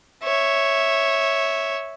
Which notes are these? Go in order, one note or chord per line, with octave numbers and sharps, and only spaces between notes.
C#5 E5